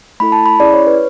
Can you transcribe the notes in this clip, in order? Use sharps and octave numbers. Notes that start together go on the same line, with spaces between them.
A3 E4 A4 B5
A5
B5
C#4 E4 G#4 D5
C#5
B4